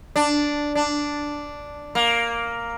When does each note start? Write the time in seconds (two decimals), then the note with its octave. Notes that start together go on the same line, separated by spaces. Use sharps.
0.16 D4
0.75 D4
1.95 A#3